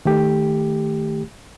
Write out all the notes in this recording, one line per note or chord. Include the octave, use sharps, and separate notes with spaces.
D#3 A3 G4